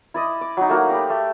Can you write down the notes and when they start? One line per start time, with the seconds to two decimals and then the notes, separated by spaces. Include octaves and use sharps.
0.14 E4 D5 D#5
0.41 D6
0.57 F#3 D#4
0.69 A3 A#3 F#4
0.90 G4 D5 B5
1.10 A3